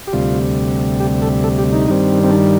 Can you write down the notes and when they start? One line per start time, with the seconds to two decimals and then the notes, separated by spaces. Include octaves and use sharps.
0.07 G4
0.13 D2 C3 G3 F4
1.00 G4
1.22 A4
1.44 A4
1.59 G4
1.73 D#4
1.87 G2 D#3 G3 C4
2.23 C4
2.31 D4